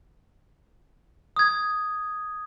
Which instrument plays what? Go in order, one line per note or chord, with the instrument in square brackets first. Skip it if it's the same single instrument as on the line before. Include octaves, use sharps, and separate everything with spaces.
[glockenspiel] D#6 G#6